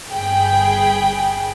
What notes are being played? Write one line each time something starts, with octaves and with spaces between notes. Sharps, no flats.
G1 G#4 G5 B5